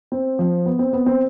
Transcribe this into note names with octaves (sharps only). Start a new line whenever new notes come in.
C4
F3
B3
C4
B3
C4